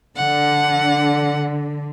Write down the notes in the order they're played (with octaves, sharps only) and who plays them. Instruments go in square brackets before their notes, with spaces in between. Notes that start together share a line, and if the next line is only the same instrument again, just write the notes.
[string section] D3 [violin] F#5